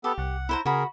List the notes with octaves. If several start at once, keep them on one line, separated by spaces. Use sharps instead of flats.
B3 G4 A4
C2 F#5
E4 C5 A#5
C#3 F#4 G#4 A#4 B5